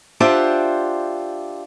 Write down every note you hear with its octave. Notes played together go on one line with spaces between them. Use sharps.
D4 F4 G4 C5 E5 F#5